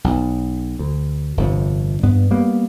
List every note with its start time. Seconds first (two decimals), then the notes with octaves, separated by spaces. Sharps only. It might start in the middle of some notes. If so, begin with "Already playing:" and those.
0.04 B1
0.79 D2
1.37 G1 F2 C3
2.03 G2 B3
2.31 G3 A#3 B3